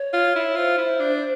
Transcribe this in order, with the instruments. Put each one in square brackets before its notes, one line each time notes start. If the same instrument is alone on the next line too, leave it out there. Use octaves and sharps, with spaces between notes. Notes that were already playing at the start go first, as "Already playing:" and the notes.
Already playing: [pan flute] C#5
[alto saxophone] F4
E4
[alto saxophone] F4 [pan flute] C5
[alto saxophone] E4
D4